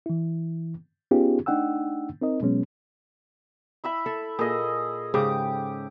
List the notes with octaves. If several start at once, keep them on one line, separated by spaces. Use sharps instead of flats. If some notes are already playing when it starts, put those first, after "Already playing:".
E3 E4
B3 C#4 D#4 F4 G4 G#4
A3 D4 D#4 F#5 G5 E6
C4 D#4 A#4 D#5
B2 F#3 G#3 B3 C#4
E4 E5 B5
A4
A#2 G#4 A4 D#5
G#2 C#3 G4 D6 D#6